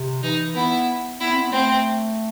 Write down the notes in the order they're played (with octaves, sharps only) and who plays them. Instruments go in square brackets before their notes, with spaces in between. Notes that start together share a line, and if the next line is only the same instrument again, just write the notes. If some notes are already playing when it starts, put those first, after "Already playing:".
Already playing: [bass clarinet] C3
[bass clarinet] E3 [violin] D#4
[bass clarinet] B3 [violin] E4
[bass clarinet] B3 [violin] E4
[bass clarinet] C4
B3
[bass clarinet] A3 [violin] C4